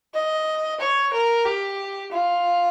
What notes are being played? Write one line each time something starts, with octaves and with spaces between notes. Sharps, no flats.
D#5
C#5
A#4
G4
F4